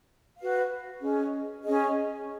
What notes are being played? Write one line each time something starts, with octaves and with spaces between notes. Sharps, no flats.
F#4 B4 F5
C#4 G#4 D#5
C#4 G#4 D#5